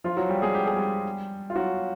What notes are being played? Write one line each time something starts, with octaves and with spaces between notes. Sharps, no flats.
F3 F4
F#3 F#4
G3 G4
G#3 G#4
G4
G#4
G3 G4
F4
F#3 F#4